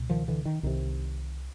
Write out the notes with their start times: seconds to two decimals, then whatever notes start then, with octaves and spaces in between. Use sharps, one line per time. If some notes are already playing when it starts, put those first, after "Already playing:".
Already playing: C#2 B2
0.10 D#3 F3
0.28 D3 E3
0.45 D#3
0.63 C2 C3 D#3